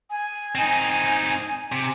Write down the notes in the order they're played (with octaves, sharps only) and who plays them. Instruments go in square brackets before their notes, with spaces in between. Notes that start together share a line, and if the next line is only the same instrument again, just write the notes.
[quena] G#5
[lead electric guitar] C4 D#4
C3